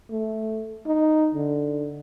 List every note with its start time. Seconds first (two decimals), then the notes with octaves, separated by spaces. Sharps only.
0.10 A3
0.86 D#4
1.35 D3